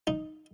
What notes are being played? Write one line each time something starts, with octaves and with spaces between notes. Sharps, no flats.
D#4